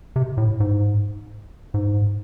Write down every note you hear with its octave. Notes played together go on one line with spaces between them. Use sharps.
C3
A2
G#2
G#2